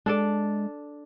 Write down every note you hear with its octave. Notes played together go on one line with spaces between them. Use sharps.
G#3 D4 A4 D5